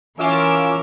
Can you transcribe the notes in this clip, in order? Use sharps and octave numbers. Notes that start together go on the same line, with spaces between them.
E3 C#4 F4 A#4 E5 D6 E7